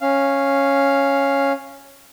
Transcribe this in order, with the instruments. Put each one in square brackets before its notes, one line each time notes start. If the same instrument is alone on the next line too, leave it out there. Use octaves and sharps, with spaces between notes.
[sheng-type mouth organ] C#4 F5